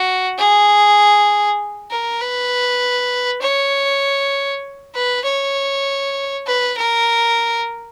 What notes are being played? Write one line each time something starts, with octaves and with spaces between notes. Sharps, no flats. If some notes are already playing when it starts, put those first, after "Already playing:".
Already playing: F#4
G#4
A#4
B4
C#5
B4
C#5
B4
A#4